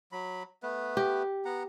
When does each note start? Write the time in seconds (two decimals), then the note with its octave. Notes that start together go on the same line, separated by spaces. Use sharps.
0.12 F#3 B5
0.63 A3 B3 B4
0.97 G4
1.45 B3 F#5 A#5